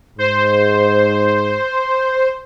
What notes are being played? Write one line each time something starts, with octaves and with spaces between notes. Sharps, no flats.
G#2 C5